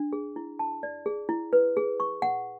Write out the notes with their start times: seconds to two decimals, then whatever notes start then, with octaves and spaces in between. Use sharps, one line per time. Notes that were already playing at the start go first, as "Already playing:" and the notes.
Already playing: D4
0.13 G#4
0.36 E4
0.59 A5
0.83 D5
1.06 G#4
1.29 E4
1.53 B4
1.77 G#4
2.00 C#6
2.22 F#5